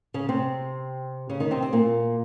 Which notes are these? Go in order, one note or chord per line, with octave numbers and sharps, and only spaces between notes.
C#3 C#4
C3 C4
C#3 C#4
D#3 D#4
C3 C4
C4
A#2 A#3